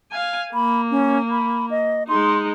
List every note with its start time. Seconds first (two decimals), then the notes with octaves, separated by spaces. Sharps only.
0.12 F5 G#5
0.54 A#3 B5
0.91 C#4
1.31 B5
1.71 D#5
2.09 G#3 D#4 C6